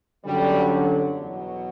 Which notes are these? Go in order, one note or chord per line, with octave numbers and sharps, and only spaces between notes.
G1 F#2 D3 F#3 G3
E2 B2 F#3